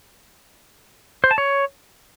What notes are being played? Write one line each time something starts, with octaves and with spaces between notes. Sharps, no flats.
C5
A5
C#5